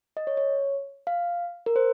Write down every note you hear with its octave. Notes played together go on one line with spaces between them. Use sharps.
D#5
C#5
C#5
F5
A#4
C5